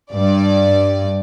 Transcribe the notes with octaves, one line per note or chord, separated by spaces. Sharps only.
G2 D5